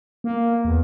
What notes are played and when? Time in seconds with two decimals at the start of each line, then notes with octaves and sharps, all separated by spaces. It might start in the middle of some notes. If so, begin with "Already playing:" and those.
0.24 A#3
0.65 E2